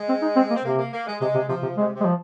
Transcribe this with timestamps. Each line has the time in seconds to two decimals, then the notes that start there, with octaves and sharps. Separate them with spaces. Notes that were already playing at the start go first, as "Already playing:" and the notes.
Already playing: G#3
0.09 C4
0.22 D#4
0.36 C4
0.50 A#3
0.55 C4
0.64 C3 A#3
0.78 A#3
0.93 A#3
1.07 G#3
1.21 C3 G#3
1.35 C3
1.49 C3 F3
1.62 C3
1.77 C3 G#3
1.95 C3 G#3
2.05 F3